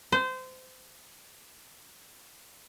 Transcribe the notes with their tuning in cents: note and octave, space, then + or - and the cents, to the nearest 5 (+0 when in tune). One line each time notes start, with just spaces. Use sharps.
C5 -25